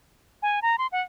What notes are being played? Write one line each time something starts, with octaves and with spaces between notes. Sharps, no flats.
G#5
A#5
C6
F#5